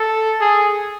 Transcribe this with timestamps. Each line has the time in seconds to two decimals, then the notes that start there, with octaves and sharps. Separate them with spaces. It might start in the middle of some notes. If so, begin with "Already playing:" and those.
Already playing: A4
0.41 G#4